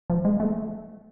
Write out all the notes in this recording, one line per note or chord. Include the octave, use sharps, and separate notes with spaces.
F3
G#3
A3